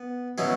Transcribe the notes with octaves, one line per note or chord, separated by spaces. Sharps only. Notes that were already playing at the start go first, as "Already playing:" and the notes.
Already playing: B3
B2 F#3 C#4 E4